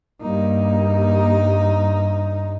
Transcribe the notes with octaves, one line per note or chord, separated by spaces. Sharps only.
G2 G3 A#3 D#4